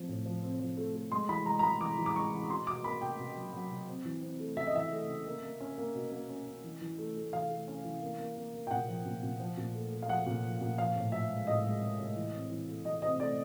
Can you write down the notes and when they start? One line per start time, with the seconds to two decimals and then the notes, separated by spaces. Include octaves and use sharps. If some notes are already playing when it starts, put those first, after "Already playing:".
Already playing: F3 C4
0.08 A2
0.26 F3
0.43 C4
0.60 F3
0.77 A3
0.95 A3
1.12 G#3 C6
1.29 E3 B5
1.46 G#3 A#5
1.59 A#5
1.63 G#3 B5
1.81 E3 D6
1.98 E3
2.06 D6
2.15 G#3 C#6
2.33 E3
2.49 B2 C6
2.67 B2 D6
2.84 A#3 B5
3.01 B2 G5
3.19 B2
3.36 F#3
3.53 F#3
3.71 B2
3.88 C4
4.05 E3
4.22 C4
4.39 A3
4.57 C#3 E5
4.67 D#5
4.74 E3 E5
4.91 A3
5.08 C#3
5.26 A#3
5.43 A#3
5.61 C#4
5.78 A#3
5.95 B2
6.12 A#3
6.30 C#4
6.47 C#4
6.64 E3
6.81 E3
6.98 A3
7.16 A3
7.33 E3 F5
7.50 A3
7.68 C#4
7.85 E3
8.02 A#3
8.19 A#3
8.36 A#3
8.54 A#3
8.67 G5
8.71 A#2 F#5
8.88 F3
9.05 A#2
9.23 A#2
9.40 F3
9.57 A#2
9.75 A3
9.92 A3
10.02 F5
10.09 F3 F#5
10.26 A#2
10.44 F3
10.61 A#2
10.78 F3 F5
10.96 A2
11.12 F3 E5
11.30 G#3
11.47 A2 D#5
11.64 G#3
11.81 G#3
11.99 A2
12.16 E3
12.33 C4
12.51 E3
12.68 A3
12.85 E3 D#5
13.02 C4 D#5
13.19 A3 D5